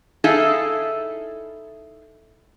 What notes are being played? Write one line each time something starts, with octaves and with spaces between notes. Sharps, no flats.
D#4 E4 G#4 A4 E5 F5